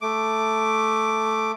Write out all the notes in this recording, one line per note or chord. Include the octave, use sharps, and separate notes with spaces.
A3 D6